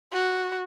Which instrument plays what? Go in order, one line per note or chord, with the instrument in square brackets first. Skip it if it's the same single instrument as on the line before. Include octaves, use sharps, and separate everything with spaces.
[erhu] F#4